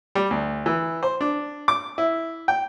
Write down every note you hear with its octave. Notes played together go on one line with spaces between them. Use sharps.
G3
D2
E3
C5
D4
D6
E4
G5